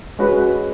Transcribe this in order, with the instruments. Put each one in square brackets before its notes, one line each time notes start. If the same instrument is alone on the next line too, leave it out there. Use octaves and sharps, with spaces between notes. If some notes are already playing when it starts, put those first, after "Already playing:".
[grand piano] G#3 C#4 F#4 [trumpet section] B4